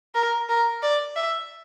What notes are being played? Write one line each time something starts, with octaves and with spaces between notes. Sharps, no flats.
A#4
A#4
D5
E5